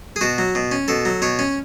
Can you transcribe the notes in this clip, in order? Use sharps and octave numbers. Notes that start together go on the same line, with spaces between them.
G#4
B2 F#4
F#3
B2
C#4
B2 A4
F#3
B2 C#5
C#4